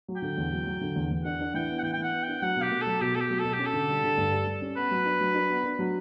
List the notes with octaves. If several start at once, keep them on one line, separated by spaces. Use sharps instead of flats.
F#3
G5
D3
E2
F#3
F#3
D3
E2
E2
D4 F#5
D4
E3 G5
B3
F#5
E3 G5
G5
E3
F#5
B3
G5
D4
F#3 F#5
B2
G4
B2
A4
F#3
B2 G4
B2 A4
G4
F#3
A4
B2
G4
C#4
A4
D3
G3
D3
G2
G3
G3
C#4
B3 B4
F#3
D4
F#3
D4
B3
D4
F#3